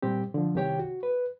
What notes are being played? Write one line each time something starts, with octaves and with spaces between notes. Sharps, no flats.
A#2 G3 C4 G4
D3 F3
C2 C3 D#3 G4 C#5 G5
F#4
B4